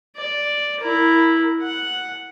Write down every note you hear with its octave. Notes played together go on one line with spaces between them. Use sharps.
D5
E4 A#4
F#5